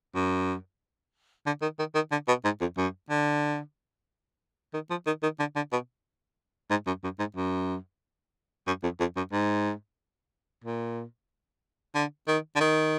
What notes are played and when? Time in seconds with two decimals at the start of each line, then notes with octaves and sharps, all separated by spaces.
0.15 F#2
1.46 D3
1.62 D#3
1.79 D#3
1.95 D#3
2.12 D3
2.28 B2
2.44 G#2
2.61 F2
2.77 F#2
3.10 D3
4.74 D#3
4.90 F3
5.06 D#3
5.23 D#3
5.39 D3
5.56 D3
5.72 B2
6.70 G#2
6.87 F#2
7.04 F#2
7.19 G#2
7.36 F#2
8.67 F#2
8.83 F2
9.00 F2
9.17 F#2
9.32 G#2
10.64 A#2
11.95 D3
12.28 D#3
12.56 D3
12.60 D#3